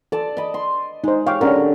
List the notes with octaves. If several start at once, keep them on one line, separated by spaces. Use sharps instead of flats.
A4 D5 A5
D#5 B5
C6
G#3 D#4 C5
G4 C#5 F5 G5 D6
D3 C#4 G#4 A#4